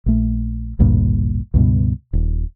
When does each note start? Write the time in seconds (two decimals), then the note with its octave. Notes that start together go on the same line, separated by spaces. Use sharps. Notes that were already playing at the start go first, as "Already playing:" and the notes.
0.06 A#1 A3
0.79 A1 D2 G2 A#2
1.54 C#2 G2 B2
2.13 D#1